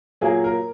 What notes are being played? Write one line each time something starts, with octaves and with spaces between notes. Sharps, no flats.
A#2 F#3 A#3 G#4
A#4